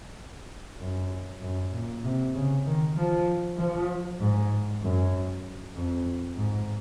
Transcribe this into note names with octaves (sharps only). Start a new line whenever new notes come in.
F#2
F#2
A#2
C3
C#3
D#3
F3
F3
G#2
F#2
F2
G#2